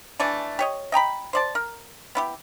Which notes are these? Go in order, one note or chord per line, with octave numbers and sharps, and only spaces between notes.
E3 A3 D4 G#5
G4 C#5 D#5
D#5 G5 A#5 B5
C5 D5 A5
A#4
B3 E4 G4